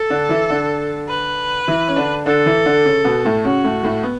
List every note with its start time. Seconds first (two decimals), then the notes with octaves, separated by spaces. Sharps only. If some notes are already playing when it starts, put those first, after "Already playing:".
Already playing: A4
0.10 D3 D4
0.29 E3 E4
0.50 D3 D4
1.08 B4
1.68 E3 E4
1.88 C#4
1.96 D3 D4
2.26 D3 D4 A4
2.46 E3 E4
2.65 D3 D4
2.85 C#3 C#4
3.05 B2 B3
3.25 A2 A3
3.45 C#3 C#4 F#4
3.64 A2 A3
3.83 A2 A3
4.03 B3